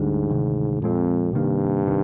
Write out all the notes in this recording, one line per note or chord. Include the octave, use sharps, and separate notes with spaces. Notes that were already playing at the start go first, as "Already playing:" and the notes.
Already playing: D2 G#2 D3 G3 D4
D2 C3 D#3
F2 A#2 F3 G#3 C4
G2 C3 D#3 A#3
C3 D#3